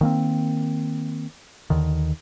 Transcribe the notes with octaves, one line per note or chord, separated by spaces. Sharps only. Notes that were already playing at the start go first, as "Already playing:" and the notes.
D#3 A#3 C4
D#2 D3 D#3